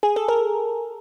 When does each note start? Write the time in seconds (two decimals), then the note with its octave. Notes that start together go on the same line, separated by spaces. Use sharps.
0.03 G#4
0.16 A4
0.28 A#4